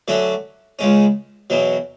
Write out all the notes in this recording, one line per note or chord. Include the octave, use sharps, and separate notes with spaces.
D3 F#3 A3 C#4 F#4
C#2 C#3 G#3 C#4
E2 B2 F#3